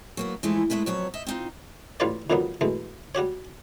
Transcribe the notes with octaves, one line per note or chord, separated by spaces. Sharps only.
F#3 A#3 B3
E3 F3 G#3 A3 D#4 E4
G#3 A3 C#4 E4 B4
F2 F#3 B3 C#5
D#5 E5
C4 D#4 F4
A1 G3 F4 B4 C#5 D5
F2 A#2 D#3 F#3 G3 B3
B2 E3 G#3 A3
G3 F#4 G4 C#5